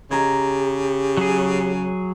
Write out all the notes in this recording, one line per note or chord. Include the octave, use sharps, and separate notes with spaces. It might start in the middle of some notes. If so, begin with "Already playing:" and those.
C#3 G4 A#5 G#6
F#3 G#4